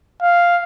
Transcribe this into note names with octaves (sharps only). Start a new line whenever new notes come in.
F5